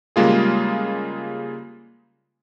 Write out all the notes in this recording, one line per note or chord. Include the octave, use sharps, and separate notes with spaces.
C#3 G3 G#3 A#3 F4 G#4